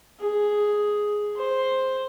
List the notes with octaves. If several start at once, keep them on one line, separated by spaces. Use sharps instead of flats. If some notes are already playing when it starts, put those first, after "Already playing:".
G#4
C5